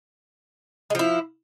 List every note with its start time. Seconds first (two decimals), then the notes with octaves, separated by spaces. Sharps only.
0.90 G#3
0.95 F3
0.99 E4